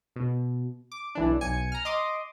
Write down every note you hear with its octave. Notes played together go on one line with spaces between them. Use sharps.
B2
D6
B1 E3 D4
B1 G#5 G#6 C#7
A#5 F6
D#5 C6 D6 D#6